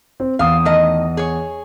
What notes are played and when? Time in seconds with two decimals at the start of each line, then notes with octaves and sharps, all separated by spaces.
0.20 C4
0.39 E2 F5 D#6
0.65 D#3 A3 D#5
1.17 G#4 C#5